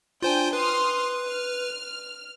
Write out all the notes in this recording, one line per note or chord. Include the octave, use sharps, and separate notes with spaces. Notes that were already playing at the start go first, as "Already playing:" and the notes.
D4 F4 C5 G5 G#5 G6
B4 C6 D#6 F6
F6